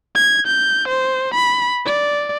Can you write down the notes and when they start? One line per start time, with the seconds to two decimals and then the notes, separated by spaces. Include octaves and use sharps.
0.15 G#6
0.47 G6
0.88 C5
1.34 B5
1.86 D5